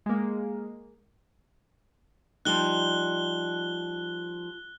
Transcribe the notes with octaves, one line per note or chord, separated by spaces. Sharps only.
G#3 A#3
F3 G3 D#4 F#6 G7